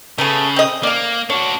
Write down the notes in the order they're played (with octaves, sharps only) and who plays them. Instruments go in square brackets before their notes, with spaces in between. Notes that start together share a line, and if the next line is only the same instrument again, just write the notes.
[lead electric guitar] C#3 [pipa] A3 B3 G#5
[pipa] C4 D#5
[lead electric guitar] A#3 [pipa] D5 F5
[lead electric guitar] D4 F#4 [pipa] C#5